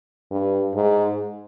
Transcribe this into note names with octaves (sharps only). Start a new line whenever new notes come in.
G2
G#2